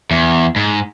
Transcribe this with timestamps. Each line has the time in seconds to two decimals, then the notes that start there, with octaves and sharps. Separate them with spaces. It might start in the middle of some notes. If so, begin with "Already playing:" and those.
0.11 E2
0.56 G#2